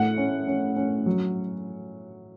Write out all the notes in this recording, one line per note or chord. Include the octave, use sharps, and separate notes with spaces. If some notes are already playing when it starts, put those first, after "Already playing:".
Already playing: A2 F#5
C#4
C#4
C#4
F#3